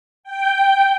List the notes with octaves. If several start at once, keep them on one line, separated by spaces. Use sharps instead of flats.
G5